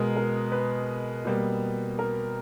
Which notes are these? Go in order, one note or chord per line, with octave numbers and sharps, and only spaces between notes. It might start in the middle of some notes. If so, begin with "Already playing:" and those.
Already playing: B2 G#3 A#4
A#4
B4
B2 G3 A#3
A#4